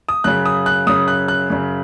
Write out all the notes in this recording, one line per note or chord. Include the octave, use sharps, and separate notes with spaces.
D#6
F#2 C#3 F#6
D#6
F#6
F#2 C#3 D#6
F#6
F#6
F#2 C#3